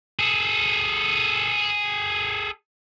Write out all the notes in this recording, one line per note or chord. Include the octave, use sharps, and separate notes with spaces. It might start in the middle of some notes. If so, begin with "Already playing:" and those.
G#4 A4